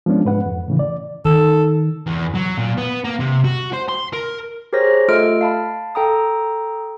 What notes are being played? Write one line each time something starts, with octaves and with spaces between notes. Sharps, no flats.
F3 G#3 B3 C#4 D4
G#2 B4 F#5
F2
A2 C#3 E3
D5
D#3 A4
E2
F#3
A#2
B3
A#3
C3
F#4
C5
C6
A#4
G4 G#4 A#4 C5 C#5 A#6
A3 F4 A4 D#5 F6 D7
F5 A5 B5
A4 G5 A#5 D#6